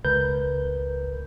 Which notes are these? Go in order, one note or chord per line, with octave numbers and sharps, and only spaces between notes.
C#2 A#4 B4 G6